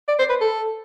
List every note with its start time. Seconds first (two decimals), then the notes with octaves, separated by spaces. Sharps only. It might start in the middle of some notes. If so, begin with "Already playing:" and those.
0.08 D5
0.19 C5
0.30 B4
0.41 A4